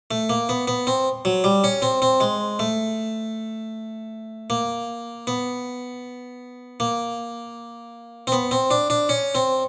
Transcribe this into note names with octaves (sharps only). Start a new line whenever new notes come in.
A3
A#3
B3
B3
C4
F#3
G3
C#4
C4
C4
G#3
A3
A#3
B3
A#3
C4
B3
C4
D4
D4
C#4
C4